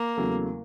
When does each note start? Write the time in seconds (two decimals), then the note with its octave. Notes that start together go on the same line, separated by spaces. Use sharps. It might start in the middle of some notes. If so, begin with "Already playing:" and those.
Already playing: A#3
0.16 E2 C#3 F#3 A3